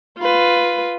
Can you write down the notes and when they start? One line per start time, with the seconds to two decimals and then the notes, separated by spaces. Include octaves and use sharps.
0.18 F4 B4